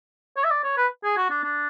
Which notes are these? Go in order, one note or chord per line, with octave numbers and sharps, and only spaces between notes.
C#5
E5
D5
C#5
B4
G#4
F#4
D4
D4